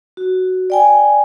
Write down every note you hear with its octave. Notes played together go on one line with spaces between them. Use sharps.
F#4
D5 G5 G#5